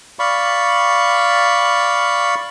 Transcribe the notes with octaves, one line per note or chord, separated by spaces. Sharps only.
D5 F5 B5 C#6